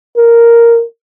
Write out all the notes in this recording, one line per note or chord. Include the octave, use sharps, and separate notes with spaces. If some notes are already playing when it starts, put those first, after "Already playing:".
A#4